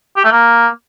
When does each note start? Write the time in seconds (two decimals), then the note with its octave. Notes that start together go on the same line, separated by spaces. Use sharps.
0.17 G4
0.24 A3
0.32 A#3